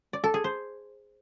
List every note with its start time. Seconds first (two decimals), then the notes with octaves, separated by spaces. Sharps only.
0.13 D5
0.24 A4
0.34 G#4
0.44 C5